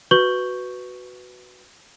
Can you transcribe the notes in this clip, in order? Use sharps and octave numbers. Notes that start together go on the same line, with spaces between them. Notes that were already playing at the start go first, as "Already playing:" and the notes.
F#4 B4 C#6 G6 F#7 G7